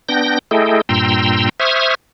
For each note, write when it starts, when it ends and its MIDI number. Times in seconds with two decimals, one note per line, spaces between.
0.09 0.39 59
0.09 0.39 62
0.09 0.39 79
0.09 0.39 91
0.09 0.39 94
0.51 0.81 57
0.51 0.81 64
0.51 0.81 68
0.51 0.81 69
0.51 0.81 75
0.51 0.81 79
0.89 1.49 43
0.89 1.49 46
0.89 1.49 79
0.89 1.49 82
0.89 1.49 84
0.89 1.49 88
1.60 1.95 72
1.60 1.95 76
1.60 1.95 85
1.60 1.95 87
1.60 1.95 89
1.60 1.95 92